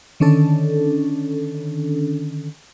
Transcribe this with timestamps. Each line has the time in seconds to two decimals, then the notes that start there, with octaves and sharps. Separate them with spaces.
0.20 D3 D#3 C#4 D4 A4